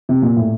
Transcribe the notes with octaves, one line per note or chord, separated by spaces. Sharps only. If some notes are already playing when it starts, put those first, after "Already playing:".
C3
A#2
A2